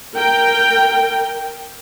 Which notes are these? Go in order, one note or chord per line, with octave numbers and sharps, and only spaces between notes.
A#4 G5